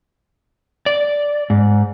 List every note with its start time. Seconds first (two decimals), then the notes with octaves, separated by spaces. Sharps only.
0.86 D5
1.50 G#2